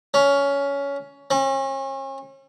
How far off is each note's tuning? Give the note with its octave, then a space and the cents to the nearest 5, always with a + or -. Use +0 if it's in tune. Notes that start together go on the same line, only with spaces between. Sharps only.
C#4 +15
C#4 -40